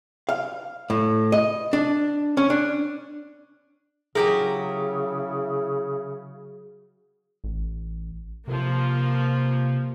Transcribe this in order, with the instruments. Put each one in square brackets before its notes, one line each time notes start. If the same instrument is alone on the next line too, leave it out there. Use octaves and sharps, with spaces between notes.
[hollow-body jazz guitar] F5
A2
D#5
D4
C#4
D4
[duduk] C#3 [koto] F#3 G4 A#4 [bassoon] E4 [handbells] G#4
[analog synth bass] A1
[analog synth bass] C3 [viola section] F3 A#3